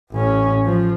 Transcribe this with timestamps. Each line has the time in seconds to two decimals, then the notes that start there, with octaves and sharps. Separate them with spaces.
0.11 A1 C#4
0.65 F3